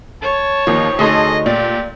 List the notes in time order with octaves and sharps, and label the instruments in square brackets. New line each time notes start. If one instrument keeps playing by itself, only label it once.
[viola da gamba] C#5 [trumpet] A5
[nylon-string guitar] D#2 [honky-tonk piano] D#3 F3 [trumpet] D#4
[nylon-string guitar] D2 D#4 [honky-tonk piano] G#4 A4 C6 [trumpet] D#5
[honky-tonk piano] A#2 [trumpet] G4 [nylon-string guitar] D5